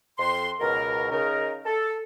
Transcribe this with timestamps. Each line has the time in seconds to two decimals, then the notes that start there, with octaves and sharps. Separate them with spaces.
0.18 F2 C6
0.60 C#2 B2 A#4
1.10 C#3 D#4 A#4
1.65 A4